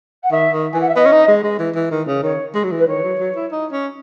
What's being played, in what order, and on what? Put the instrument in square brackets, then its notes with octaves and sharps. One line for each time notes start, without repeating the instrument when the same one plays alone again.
[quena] F#5
[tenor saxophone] D#3 [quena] E5
[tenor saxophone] D#3
[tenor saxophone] E3 [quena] G#5
[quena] F#5
E5
[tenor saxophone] B3 [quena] D#5
[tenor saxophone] C#4
D#4
G#3
G#3
E3
E3
D#3
C#3
[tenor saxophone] D#3 [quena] C#5
[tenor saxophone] G#3
F#3
E3
[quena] B4
[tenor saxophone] D#3 [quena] C#5
[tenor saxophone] F#3
F#3
E4
D#4
C#4